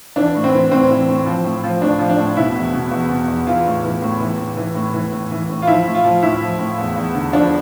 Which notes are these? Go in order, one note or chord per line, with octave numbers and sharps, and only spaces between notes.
E3 D4
A2
C4
E3
A2 C4
E3
A2
F3
A2
F3
A2 D4
F3
D4
A2
B2 E4
E2
B2
E2
B2
E2
E3 F4
A2
E3
A2
E3
A2
E3
A2
E3
A2
E3
A2
F4
F3 E4
A2
F4
F3
A2 E4
F3
A2
E2
E2
D3
F3 D4